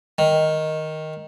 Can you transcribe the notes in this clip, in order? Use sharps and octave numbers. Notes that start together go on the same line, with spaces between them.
D#3